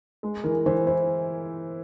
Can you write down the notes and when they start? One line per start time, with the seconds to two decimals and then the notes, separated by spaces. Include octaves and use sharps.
0.23 G#3
0.44 E3 A#4
0.66 E3 C5
0.87 E4 C5